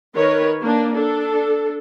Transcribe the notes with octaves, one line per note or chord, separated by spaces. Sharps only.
D#3 A#4 B4 C#5
A#3 D4
D4 A4